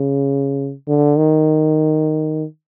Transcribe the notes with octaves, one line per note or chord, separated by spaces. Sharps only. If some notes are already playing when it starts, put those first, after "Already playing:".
Already playing: C#3
D3
D#3